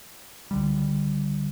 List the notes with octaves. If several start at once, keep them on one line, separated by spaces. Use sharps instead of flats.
C#2 D3 G3